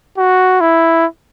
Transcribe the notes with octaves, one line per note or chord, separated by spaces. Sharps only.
F#4
E4